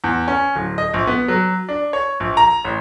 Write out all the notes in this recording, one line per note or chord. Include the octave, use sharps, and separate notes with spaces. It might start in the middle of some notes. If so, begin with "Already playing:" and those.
E2
C#4
D1
D#5
A#1
B3
F#3
D4
C#5
A#1
A#5
A1